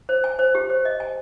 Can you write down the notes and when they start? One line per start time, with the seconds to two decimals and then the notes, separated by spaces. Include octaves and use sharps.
0.09 C5
0.24 G#5
0.39 C5
0.55 G4
0.70 C5
0.85 D#5
1.00 G#5